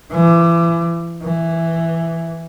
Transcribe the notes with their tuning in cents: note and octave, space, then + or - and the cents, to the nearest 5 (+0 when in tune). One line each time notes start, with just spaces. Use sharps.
E3 +35
E3 +5